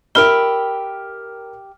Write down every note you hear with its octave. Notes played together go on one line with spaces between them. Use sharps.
G4 A#4 E5 B5 F6 G7